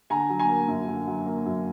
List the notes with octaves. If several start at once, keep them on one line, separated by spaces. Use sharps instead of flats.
D3 G#5 A#5
F#3
G#5 A#5
A#3
F#2
D3
F#3
A#3
F#2